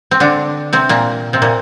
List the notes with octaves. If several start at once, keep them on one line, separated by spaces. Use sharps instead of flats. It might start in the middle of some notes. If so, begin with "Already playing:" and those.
C4
D3 D4
C3 C4
A#2 A#3
C3 C4
A#2 A#3